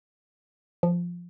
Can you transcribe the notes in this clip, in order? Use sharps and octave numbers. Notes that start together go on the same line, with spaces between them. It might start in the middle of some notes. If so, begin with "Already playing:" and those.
F3